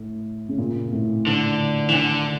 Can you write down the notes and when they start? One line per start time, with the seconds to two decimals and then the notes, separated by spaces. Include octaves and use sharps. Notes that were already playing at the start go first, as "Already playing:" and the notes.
Already playing: A2
0.49 C#3
0.58 A#2
0.92 A2
1.27 D3
1.89 E3
1.95 D3